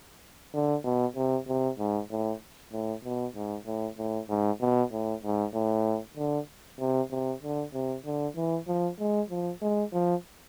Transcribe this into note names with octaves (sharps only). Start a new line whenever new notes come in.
D3
B2
C3
C3
G#2
A2
A2
B2
G#2
A2
A2
G#2
B2
A2
G#2
A2
D3
C3
C3
D3
C3
D3
E3
F3
G#3
F3
G#3
F3